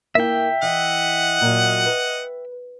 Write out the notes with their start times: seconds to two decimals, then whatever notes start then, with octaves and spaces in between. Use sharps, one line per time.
0.15 A#3 E4 E5 G5
0.62 E3 D#5 F#5
1.41 A#2 F#3
1.86 B4